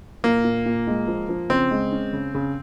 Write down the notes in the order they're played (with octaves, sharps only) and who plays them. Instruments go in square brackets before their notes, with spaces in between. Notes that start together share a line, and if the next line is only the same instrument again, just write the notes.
[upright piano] A#2 [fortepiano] A#3
[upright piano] A#2
A#2
G#3
F3
F3
[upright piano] C#3 [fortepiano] C4
[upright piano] G#3
C#4
C#3
C#3